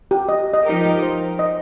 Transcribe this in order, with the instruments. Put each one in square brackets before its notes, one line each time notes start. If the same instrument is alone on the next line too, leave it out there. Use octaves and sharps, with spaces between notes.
[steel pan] G4
D#5
D#5
[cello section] F3 D#4 G4 A#4
[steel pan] C5
D#5